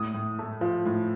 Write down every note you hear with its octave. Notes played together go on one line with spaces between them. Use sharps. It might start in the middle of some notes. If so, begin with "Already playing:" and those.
Already playing: A2 D#6
A2
A3
F3
A2